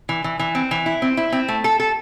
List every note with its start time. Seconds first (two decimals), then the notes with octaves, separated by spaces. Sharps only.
0.09 E3
0.24 E3
0.39 E3
0.55 C4
0.71 E3
0.86 E4
1.02 C4
1.17 E4
1.32 C4
1.48 A3
1.64 A4
1.80 A4